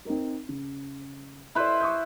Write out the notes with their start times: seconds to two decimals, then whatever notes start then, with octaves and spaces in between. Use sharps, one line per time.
0.05 C4 D#4 A#4
0.49 C#3
1.55 E4 A4 B4 C5 D5
1.80 C#6 D#6 G6